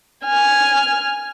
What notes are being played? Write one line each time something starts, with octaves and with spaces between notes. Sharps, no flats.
G#5 F6